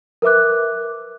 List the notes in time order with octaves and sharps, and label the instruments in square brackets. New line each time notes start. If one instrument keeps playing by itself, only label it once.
[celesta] A#4 B4 E5 D6 F#6